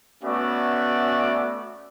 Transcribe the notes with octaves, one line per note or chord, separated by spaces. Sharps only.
A3 B3 C#4 F#4 D5 E5